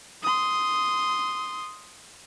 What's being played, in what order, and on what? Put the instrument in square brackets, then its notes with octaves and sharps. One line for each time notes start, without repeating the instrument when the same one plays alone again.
[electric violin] C6 D#6